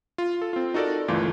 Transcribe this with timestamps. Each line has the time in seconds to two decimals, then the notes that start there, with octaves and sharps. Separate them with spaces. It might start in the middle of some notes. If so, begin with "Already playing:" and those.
0.18 F4
0.42 A4
0.53 C4 F4
0.74 D#4 F#4 A4 A#4 D5
1.08 G1 C#2 E3 A3 F4 D6